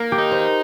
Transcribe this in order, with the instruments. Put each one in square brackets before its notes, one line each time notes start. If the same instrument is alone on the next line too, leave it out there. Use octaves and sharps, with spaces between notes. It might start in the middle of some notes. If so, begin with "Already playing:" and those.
Already playing: [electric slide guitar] A#3 [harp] A#4
[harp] G4
[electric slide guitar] D#4
[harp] C5